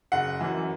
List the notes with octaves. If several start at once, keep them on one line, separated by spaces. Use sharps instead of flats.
F#1 F#5
F#2 E3